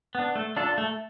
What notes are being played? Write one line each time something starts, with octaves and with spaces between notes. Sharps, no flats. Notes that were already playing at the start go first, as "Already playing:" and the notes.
B3 D4
A3
D4 F4 A4
A3